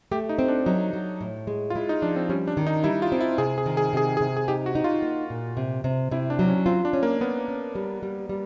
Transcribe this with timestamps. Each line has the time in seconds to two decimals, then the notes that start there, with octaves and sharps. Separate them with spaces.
0.11 A3 G4
0.29 D#4
0.39 C4
0.48 D4
0.66 F#3 D#4
0.93 F#3
1.21 A2
1.47 G#3
1.70 F4
1.75 G#3 E4
1.89 D#4
2.02 F3 D4
2.16 C4
2.29 G3 C#4
2.47 D4
2.57 D#3
2.67 D#4
2.84 G3 E4
3.02 F4
3.12 C4
3.21 E4
3.38 C3 G#4
3.58 G#4
3.66 D#3
3.77 G#4
3.93 C3 G#4
4.17 C3 G#4
4.37 G#4
4.48 D#4 G4
4.66 F#4
4.75 D#4
4.84 F4
5.02 A#3
5.30 A#2
5.57 C3
5.84 C3
6.11 C3 E4
6.30 D4
6.39 F#3
6.48 C#4
6.66 C4 F4
6.85 D4
6.93 C#4
7.03 A#3
7.20 B3 C#4
7.48 C#4
7.75 G3
8.03 G3
8.29 G3